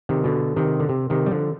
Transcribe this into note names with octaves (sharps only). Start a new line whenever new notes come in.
C3 D#3
B2 D3
C3 D#3
D3
C3
C3 D#3
G3
D3 F3